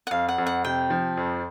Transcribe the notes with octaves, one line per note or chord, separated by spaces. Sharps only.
F#5
F2 F5
F#5
F2
F#5
C3 G5
F3
F2